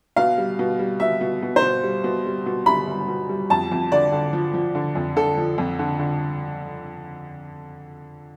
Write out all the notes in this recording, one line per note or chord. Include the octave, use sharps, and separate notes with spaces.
B2 F5
G3
B2
G3
B2 E5
B2
B2
C5
B2
G3
B2
G3
B2
G3 B5
G3
B2
G3
F2 A5
F2
D3 D5
D3
F3
F3
D3
F2
D3 A4
F3
F2
D3
D3